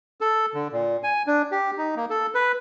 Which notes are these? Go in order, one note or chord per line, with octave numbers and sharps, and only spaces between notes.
A4
D3
A#2
G#5
D4
G4
D#4
A#3
A4
B4